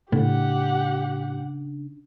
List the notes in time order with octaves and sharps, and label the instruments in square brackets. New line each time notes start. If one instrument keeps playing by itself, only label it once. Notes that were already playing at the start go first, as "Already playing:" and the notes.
[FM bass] A2 [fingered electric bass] C#3 D4 [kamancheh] G4 F#5